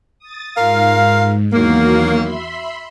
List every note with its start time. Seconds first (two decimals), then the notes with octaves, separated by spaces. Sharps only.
0.19 D#6 A6
0.57 G#2 F4 A#4 F5
1.53 E2 D#3 F#3 A#3 F#4
2.20 E5 B5 C6